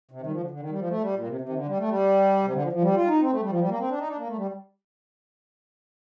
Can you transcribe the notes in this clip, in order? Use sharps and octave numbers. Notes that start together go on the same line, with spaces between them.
C3
D#3
G3
F3
D3
D3
D#3
G3
F3
A3
G3
A#2
C3
C3
D#3
D3
G3
A3
G3
C3
D3
F3
F3
G3
F4
D#4
C4
A3
G3
F3
G3
A#3
C4
D4
D#4
D4
A#3
A3
G3